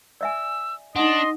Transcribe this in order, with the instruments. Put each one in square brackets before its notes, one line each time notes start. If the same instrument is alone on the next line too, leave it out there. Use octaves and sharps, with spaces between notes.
[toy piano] D5 E5 G#5 [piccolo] E6
[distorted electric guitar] D4 [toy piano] D#4 F#5 [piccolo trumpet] D#5 [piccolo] C6